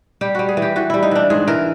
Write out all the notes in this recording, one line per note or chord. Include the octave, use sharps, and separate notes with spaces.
G3 G4
G3 F#4
G#4
E3
G4
E3 F#4
G3 E4
D#4
E3 D4
G#2 G#4
E3 A#4